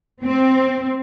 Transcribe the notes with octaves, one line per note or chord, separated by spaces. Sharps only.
C4